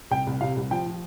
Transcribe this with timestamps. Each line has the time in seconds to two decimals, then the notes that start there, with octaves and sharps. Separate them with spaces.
0.11 C2 G5
0.27 C2
0.41 C3 F5
0.57 C2
0.71 F3 G5
0.86 F3